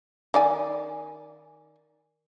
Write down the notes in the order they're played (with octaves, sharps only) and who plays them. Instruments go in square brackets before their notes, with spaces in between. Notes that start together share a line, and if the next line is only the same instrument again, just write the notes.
[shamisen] D#3 D5 G#5